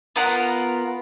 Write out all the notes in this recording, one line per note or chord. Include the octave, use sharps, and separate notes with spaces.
B3 F4 A#4 F#5